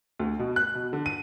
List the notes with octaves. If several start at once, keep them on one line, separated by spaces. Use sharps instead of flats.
D2
B2
F#6
B2
D3
D#7